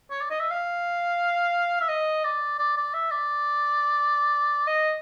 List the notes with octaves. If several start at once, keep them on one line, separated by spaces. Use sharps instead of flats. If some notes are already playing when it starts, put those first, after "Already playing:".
C#5
D5
D#5
E5
F5
E5
D#5
D5
D5
D5
E5
D5
D#5